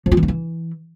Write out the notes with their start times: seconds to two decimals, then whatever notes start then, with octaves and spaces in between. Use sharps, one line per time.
0.06 F3
0.12 F4
0.17 E3
0.23 D#4
0.28 E3